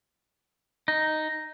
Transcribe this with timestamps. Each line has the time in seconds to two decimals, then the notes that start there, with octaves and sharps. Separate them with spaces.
0.88 D#4